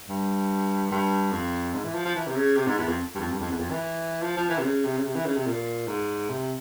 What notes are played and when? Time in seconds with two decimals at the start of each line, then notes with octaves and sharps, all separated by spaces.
0.09 G2
0.91 G2
1.32 F2
1.74 G#2
1.84 E3
1.94 F3
2.05 F3
2.15 E3
2.27 C3
2.36 C#3
2.56 C3
2.67 G#2
2.77 E2
2.88 F2
3.15 G2
3.19 F2
3.31 G2
3.40 F2
3.50 E2
3.60 F2
3.71 E3
4.23 F3
4.36 F3
4.49 E3
4.59 C3
4.64 C#3
4.84 C3
4.97 C#3
5.05 C3
5.15 E3
5.26 C#3
5.36 C3
5.46 A#2
5.87 G#2
6.29 C3